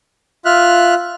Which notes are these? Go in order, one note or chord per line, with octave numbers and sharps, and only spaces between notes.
F4 E5 F6 F#6